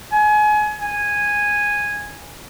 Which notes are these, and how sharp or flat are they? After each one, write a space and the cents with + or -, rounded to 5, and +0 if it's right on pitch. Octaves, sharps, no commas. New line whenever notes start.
G#5 +30
G#5 -10